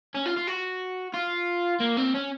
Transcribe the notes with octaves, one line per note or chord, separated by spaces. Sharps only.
C#4
F4
F4
F#4
F4
A#3
C4
C#4